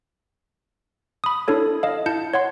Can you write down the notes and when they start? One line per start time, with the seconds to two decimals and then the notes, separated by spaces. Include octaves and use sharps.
1.24 B5 D#6
1.48 D4 E4 A4 C#5
1.83 D#5 F5
2.06 E4 A5 G6 C#7
2.34 C#5 F#5 C6